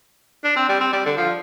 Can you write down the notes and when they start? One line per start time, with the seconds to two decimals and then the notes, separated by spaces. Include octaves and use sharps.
0.44 D4
0.56 C4
0.69 G3
0.81 C4
0.93 G3
1.06 D3
1.18 F3